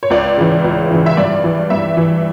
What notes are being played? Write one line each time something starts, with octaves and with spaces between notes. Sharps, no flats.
C#5
C#2 D5
C#3 E3
C#2
C#3 E3
E5
G2 D5
E3
G2 E5
E3